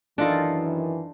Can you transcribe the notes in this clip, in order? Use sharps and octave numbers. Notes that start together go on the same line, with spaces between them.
F#2 D#3 E3 D4 D#4 F4 A4